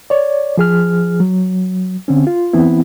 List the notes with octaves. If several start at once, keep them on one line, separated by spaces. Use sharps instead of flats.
C#5 D5
F3 G#4 F6
F#3
D3 C4 C#4
F4
E3 B3 C4 E4